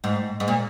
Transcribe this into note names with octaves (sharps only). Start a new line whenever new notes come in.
G#2
G#2
A#2